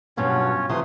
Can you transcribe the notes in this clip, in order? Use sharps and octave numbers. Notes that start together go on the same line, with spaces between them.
G2 B2 F#3 C#4 F4 C#5
C3 E3 F3 A3 C6 D#6